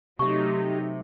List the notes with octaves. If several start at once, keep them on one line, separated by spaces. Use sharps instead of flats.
C3 F#3 A3 D#4 G4 E5 C#6